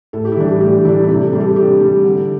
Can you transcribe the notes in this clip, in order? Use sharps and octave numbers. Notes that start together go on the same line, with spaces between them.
A2 A4
G4
E4
E3 G3 D4 G4
G4
A2 G4
E3 G3 D4 E4
E4
C3 G4
A4
G3 D4 G4
A4
C3 G4
G3 D4
D3